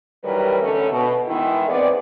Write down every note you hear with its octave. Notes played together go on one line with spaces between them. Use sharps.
D#3 E3 F#3 G3 A#4 B4
D3 A3 C#4
B2
D#3 E3 G#3 B3 E4
B3 C4 G#4 D5